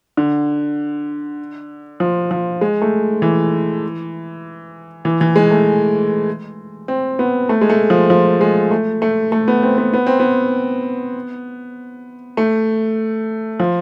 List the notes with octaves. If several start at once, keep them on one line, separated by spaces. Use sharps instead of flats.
D3
F3
F3
G#3
A3
E3
E3
E3
G#3
A3
C4
B3
A3
G#3
A3
F3
F3
G#3
A3
A3
A3
B3
C4
B3
B3
C4
B3
A3
F3